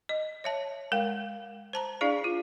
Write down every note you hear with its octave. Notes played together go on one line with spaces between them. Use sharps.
D#5
C#5 E5 A5
G#3 A#4 F5 G5
C5 A5 A#5
D4 E4 G#4 D5 F5
F4